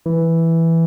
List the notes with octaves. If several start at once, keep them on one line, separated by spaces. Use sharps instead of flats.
E3